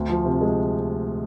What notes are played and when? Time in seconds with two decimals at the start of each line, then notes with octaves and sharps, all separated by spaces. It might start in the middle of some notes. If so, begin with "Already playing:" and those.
Already playing: D2
0.09 F3
0.25 C3
0.41 G#3